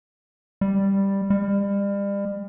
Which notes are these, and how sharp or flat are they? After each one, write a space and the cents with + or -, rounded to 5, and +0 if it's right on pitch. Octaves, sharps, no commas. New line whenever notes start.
G3 +5
G3 +35